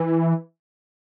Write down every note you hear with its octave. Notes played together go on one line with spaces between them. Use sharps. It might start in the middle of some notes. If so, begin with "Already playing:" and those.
Already playing: E3